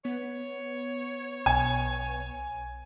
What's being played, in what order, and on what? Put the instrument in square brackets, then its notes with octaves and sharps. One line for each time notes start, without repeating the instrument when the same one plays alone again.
[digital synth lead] B3 [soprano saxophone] C#5
[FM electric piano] B1 [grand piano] G#5